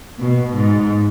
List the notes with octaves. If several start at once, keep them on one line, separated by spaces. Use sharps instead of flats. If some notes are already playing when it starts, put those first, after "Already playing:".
B2
G#2